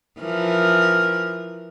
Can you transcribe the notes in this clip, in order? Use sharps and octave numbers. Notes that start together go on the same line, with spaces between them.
E3 F3 A#4